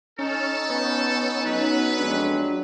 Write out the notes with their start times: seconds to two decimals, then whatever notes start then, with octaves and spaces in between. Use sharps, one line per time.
0.19 C#4 D#4 A4 F6
0.69 B3 C#4
1.45 F#3 D#4 B4
1.98 F2 G#3 D4